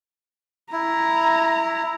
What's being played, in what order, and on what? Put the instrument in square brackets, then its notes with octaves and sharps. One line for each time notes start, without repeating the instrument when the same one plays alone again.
[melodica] E4 [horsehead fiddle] A#5